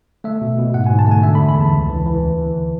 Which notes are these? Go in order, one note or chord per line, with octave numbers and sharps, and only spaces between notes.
A3 E5
B2
B2
G#2 F#5
G#2 G#5
A5
A3 G#5
D3 E5
B5
E2
B5
E2 A5
C#2
E3
E3
D2
E3